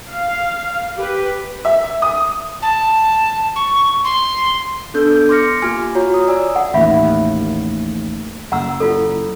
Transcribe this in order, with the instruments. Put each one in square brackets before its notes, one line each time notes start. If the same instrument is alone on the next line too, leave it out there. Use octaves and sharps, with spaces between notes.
[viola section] F5
G4 B4
[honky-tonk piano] E5
D#6
[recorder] A5
C#6
C6
[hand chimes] B3 D4 A4 G6
C6 D6 F6 A#6 C#7
A#3 F4 G4 G#5 F6
F4 F#4 C#5 A#5
D#6
D5 G#5 E6
[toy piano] F#5
[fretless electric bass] A1 D#2 [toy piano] F4 E5 B5
[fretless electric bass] F#1 [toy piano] F#5 A#5 E6
[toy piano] E4 F4 A4